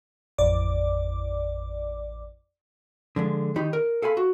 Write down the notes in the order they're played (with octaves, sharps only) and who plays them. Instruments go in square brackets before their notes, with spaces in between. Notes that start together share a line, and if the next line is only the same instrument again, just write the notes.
[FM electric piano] A1 F2 D5 D6
[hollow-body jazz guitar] D3 F3 G#3
D#3 D#4 G4 B5
A#4
A4 F5 G#5 B5
F#4